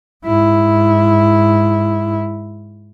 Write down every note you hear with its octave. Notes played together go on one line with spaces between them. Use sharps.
G#2 E4